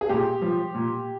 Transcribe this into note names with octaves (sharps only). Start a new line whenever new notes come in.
G#4
A#2 G4
F3
A#2